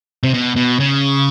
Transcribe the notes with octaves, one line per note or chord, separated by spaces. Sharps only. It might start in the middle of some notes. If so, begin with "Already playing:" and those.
C3
B2
B2
C#3